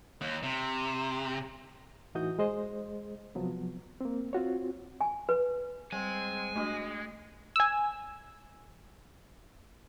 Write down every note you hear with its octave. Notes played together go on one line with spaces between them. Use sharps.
D#2
C3
A2 E3 D#4 F#4 D#6 G6
G#3 G#4 C5 D#5
C3 F3 F#3 B3
A#3 C4
C4 F4 F#4 C#5
G#5
B4
G3 G#3 C4 G#5
A3 D4 F#4 D#5
G#5 E6